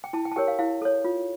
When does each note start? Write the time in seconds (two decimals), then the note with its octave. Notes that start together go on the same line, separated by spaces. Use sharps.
0.04 G5
0.13 E4 A5
0.25 G5
0.32 A5
0.36 G4 A#4 C#5 G5
0.48 F5
0.59 E4 F5
0.82 A4 C#5
1.04 F4